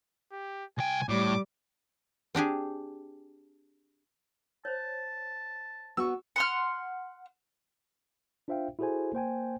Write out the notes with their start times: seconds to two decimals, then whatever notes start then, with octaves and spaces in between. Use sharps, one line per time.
0.32 G4
0.78 C2 G5 G#5
1.09 A2 G3 D6
2.35 C4 D4 G4 G#4
4.65 C5 C#5 A5
5.97 B3 F#4 C#6 E6
6.36 F#5 C6 F6
8.48 D4 F4 C5 E5 F5 G5
8.79 E4 F#4 G#4 A4 C5 G#5
9.13 A#3 C5 G5 G#5